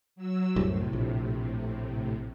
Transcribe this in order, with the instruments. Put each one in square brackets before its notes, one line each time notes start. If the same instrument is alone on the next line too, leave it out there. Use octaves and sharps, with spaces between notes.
[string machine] F#3 E6
[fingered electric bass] C2 F#2 [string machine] A2 C3
[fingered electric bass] A#1